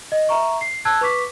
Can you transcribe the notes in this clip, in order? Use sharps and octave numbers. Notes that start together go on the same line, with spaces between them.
D#5
E5 A#5 C#6
C7
A5 E6 F#6 G#6
B4 C#6 D6 B6